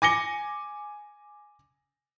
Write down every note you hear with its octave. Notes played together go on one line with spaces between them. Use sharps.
G#5 D6 A#6 C#7 G7